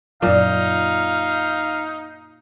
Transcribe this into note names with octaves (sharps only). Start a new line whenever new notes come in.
F#2 A#2 F#3 D#4 F5